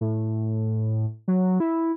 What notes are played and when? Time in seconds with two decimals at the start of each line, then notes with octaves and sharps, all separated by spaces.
0.01 A2
1.28 F#3
1.60 E4